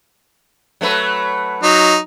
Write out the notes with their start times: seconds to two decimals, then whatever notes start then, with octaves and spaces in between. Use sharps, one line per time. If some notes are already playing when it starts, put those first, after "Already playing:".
0.81 F#3 A3 B4
1.63 F#3 D#4